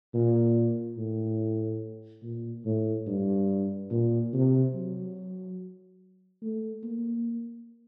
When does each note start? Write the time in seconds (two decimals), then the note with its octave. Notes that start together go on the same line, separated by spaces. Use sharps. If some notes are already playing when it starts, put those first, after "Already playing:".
0.14 A#2
0.98 A2
2.23 A#2
2.65 A2
3.07 G2
3.91 A#2
4.33 C3
4.74 F#3
6.42 A3
6.83 A#3